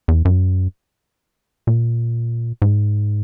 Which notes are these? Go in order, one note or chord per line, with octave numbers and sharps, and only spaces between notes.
E2
F#2
A#2
G#2